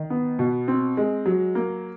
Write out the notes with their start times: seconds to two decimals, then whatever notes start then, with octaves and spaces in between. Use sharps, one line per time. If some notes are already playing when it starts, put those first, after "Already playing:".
Already playing: D#3
0.10 B3
0.39 B2
0.68 C4
0.97 G#3
1.26 F#3
1.55 A#3